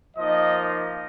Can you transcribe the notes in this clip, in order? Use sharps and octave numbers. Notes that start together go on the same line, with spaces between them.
F3 A#3 D#4 D#5
D#5